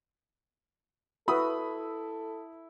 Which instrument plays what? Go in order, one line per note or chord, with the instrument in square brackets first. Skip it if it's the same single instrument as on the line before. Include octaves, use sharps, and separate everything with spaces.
[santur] E4 [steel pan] F#4 B4 [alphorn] A4 [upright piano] B5 D#6